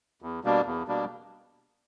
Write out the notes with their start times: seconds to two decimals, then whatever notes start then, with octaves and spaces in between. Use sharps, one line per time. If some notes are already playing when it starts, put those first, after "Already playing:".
0.22 E2
0.44 B2 G3 A#3 D4
0.66 E2
0.88 B2 G3 A#3 D4